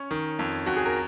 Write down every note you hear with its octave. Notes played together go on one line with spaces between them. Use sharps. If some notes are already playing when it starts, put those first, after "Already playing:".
Already playing: C#4 C#5
D#3
F2
F2 F#4
G#4
A#4